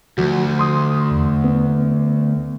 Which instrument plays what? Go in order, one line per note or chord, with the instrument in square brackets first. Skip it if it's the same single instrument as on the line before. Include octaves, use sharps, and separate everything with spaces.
[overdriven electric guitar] D2 [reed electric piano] F3 F#4
[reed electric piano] C6 D#6
E2
B3